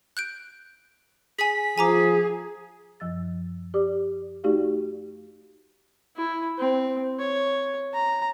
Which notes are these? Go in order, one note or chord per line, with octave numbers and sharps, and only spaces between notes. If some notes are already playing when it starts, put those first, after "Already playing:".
F#6 G6 D7
G#4 G#5 B6
F3 G#4 G#5 A#5 D6
F#2 F3 E6 A6
G4 D5 D6 D#6
A3 D#4 F#4 G4 D5 F5
E4
C4
C#5
A#5